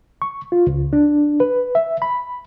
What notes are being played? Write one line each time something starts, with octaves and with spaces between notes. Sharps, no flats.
C#6
F4
C#2
D4
B4
E5
B5